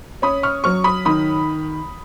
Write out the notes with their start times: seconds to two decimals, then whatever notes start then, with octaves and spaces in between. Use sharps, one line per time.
0.22 C#4 B5 D#6
0.43 C#6 F6
0.64 F#3 C#6 F6
0.84 B5 D#6
1.05 D#3 B5 D#6